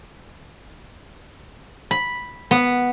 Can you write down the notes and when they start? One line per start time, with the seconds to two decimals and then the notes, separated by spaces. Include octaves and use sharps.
1.91 B5
2.51 B3